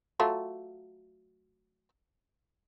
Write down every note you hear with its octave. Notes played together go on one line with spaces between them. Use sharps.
F#3 A3 F4